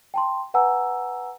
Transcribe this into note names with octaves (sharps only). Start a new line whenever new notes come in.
G5 A5 C6
B4 F#5 G#5 A#5 E6